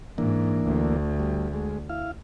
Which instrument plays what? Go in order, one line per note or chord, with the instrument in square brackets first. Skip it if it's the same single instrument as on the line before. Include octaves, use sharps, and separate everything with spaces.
[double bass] G#2 [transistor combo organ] E3 A#3 D4
[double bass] D2
[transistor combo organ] G3
G#3
E4 F5